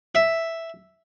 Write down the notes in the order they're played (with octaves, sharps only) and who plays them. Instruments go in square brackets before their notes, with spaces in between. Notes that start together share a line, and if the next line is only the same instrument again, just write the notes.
[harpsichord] E5